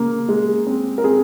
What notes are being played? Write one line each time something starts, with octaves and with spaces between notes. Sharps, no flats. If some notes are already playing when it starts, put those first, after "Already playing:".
Already playing: C#3 A#3
G#3
C4
A#4
C4 G#4